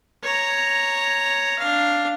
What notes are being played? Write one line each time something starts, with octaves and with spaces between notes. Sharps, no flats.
C#5 A#5
D4 F5